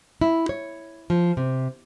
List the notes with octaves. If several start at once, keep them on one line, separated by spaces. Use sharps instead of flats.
E4
C#5
F3
C3